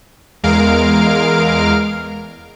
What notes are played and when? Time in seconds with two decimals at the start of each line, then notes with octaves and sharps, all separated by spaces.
0.44 E2 G#3 A#4 F5 F6 D7